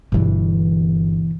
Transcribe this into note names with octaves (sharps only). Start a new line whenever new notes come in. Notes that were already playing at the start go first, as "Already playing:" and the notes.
G1 G2 B2 E3